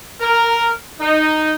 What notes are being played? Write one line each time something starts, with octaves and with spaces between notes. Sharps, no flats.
A#4
D#4